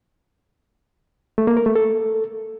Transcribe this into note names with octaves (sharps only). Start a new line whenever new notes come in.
A3
A#3
A#4
A3
A4